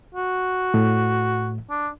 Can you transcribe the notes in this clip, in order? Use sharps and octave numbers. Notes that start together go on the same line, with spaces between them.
F#4
A2
D4